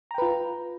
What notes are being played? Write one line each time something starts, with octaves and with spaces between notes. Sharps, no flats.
F4 B4 G5 A#5